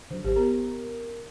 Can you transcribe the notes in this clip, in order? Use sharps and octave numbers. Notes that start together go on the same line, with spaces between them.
D3 F#3 C5
G#1 G4 C5
B3 G4 A#4